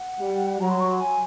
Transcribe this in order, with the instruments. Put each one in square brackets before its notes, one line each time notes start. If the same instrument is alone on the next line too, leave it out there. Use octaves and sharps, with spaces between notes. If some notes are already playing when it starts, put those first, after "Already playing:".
Already playing: [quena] F#5
[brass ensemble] G3
[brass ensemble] F#3 [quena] A#5
[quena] C6
C#6
C6
G#5